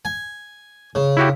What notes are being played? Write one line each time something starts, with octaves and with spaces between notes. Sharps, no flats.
G#5
C#3
E4 F#4 G4